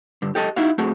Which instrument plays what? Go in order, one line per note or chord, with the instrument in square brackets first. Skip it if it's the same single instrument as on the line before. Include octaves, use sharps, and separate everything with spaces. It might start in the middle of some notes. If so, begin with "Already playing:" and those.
[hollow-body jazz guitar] G2 D3
G4 A4 D#5 A5
D#4 E4 F#4 F5
A3 C4 F#4 G#4